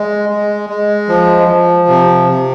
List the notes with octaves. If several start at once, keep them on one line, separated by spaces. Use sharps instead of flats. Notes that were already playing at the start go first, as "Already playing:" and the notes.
Already playing: G#3
G#3
G#3
F3
F3
C3
C3